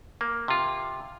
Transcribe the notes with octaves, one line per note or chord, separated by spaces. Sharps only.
A#3
C3 F4